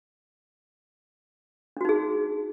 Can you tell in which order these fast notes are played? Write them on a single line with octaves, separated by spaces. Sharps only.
D4 F#4 D#4 G#4